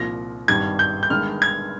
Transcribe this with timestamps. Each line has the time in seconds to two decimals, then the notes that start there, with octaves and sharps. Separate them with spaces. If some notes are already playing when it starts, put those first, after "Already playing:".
Already playing: C2 A#2 F3 A#6
0.48 G#1 G2 G3 G#6
0.79 G6
1.03 G6
1.10 G1 G2 D#3 G#3 F6
1.42 G#6